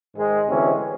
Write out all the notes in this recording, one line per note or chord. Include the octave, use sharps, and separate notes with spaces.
G#2 D#3 G#3
D2 C3 E3 G#3 C#4